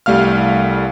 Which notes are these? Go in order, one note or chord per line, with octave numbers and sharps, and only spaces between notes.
C2 G3 A3 F5 F6